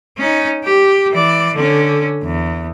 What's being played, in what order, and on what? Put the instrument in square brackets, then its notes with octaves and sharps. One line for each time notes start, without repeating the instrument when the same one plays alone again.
[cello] C#4 D#4
G4
E3 D5
D3 C#4
E2